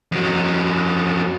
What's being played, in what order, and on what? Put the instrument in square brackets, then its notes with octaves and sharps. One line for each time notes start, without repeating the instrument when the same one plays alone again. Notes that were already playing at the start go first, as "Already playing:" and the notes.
[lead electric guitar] F2 F#3